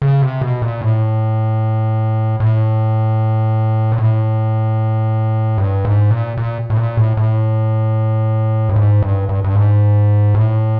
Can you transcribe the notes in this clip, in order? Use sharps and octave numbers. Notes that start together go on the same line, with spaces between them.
C#3
C3
B2
A#2
A2
A2
A#2
A2
G2
G#2
A#2
A#2
A2
A#2
A2
A2
G2
G#2
G2
G2
G2
G#2
A2